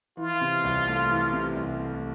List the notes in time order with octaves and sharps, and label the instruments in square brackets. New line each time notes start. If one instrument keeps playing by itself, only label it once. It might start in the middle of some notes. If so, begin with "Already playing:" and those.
[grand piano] E3 [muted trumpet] F4
[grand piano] C3
C2
A3
E3
C3
C2
A3